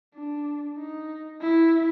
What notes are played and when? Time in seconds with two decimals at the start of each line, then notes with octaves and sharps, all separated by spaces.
0.15 D4
0.78 D#4
1.41 E4